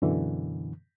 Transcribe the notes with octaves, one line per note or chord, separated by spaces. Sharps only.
F#2 B2 D3 E3